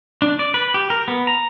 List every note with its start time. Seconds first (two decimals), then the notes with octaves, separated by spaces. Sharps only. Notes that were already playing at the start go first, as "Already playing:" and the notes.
0.22 D4
0.39 D5
0.54 B4
0.74 G4
0.90 A#4
1.08 B3
1.27 A#5